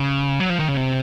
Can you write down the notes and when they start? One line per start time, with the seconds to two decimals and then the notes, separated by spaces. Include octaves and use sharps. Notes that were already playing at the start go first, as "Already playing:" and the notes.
Already playing: C#3
0.40 F#3
0.49 F3
0.59 D#3
0.68 C#3
0.77 C3